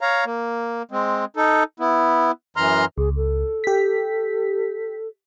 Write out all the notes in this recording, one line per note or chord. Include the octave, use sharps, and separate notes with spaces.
C#5 F5 A#5
A#3
G#3 C4
D#4 A4
B3 E4
F#2 E3 A#5 C6 F6
C#2 G#4
A4
G4 B6